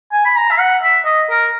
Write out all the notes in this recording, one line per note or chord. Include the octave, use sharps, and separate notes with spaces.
G#5
B5
A#5
E5
F#5
E5
D#5
A#4